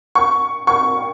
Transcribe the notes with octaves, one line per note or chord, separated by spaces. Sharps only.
C#6
C#6